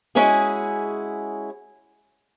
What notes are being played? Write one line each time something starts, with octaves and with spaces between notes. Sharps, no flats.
G#3 C#4 E4 F#4 G#4